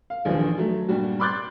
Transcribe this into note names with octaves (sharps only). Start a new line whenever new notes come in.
F5
A#1 D#2 D3 E3 F3
F#3 A3
G2 A#2 G3 F#4
B5 C6 D6 F#6 G6 A6